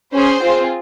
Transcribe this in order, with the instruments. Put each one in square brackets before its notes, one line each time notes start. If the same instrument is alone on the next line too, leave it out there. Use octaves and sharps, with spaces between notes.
[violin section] C#4 G#4 C5
C4 F4 G#4